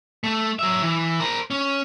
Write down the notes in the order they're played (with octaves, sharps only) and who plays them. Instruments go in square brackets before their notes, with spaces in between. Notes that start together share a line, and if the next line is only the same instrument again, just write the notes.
[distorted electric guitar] A3
F#3 E5
E3
A#4 C5
C#4